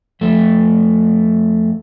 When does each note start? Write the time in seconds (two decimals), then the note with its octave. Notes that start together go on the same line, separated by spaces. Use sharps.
0.21 F2 A3